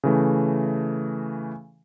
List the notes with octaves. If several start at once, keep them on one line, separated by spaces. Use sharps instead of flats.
C#3 E3 A3